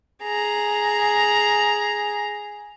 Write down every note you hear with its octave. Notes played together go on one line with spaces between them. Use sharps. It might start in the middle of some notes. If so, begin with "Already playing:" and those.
G#4 A#5